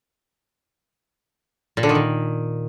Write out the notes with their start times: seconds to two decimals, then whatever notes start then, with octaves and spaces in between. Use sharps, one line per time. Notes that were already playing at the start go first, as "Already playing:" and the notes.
1.77 A#2
1.83 D3
1.89 D#3
1.95 A#2